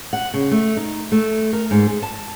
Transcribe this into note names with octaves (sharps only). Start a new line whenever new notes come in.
F#5
C#3
A3
D#4
A3
A#4
G#2
G#4
A5